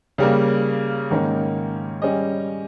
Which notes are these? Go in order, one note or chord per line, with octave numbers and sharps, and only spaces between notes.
C#3 G3 A#3
G#2 D#3 A#3 C#4
G3 C#4 G#4 D#5